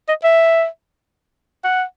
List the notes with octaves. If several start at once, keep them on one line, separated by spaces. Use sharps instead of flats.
D#5
E5
F#5